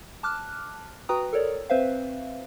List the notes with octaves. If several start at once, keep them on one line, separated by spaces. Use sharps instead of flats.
A5 D6 F6 F#6
F#4 B4 G5 A#5 D#6
A4 A#4 C#5 D5
C4 B4 C5 E5 F5